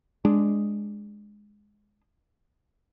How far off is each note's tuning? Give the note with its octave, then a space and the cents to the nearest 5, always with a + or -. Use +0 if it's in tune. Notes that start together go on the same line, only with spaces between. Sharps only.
G#3 +0 D4 +0